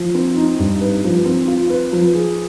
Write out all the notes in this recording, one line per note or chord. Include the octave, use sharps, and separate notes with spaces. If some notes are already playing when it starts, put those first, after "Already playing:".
Already playing: F3
C4
D#4
G2
B4
F3
C4
F4
B4
F3
G#4